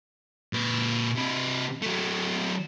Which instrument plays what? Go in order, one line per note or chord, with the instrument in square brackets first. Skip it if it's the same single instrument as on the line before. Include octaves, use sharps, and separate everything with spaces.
[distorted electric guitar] A#2 B4
C3 B4
F#3 A3